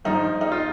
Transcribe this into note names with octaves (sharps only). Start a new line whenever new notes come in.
G2 F3 D#4
D#4
F4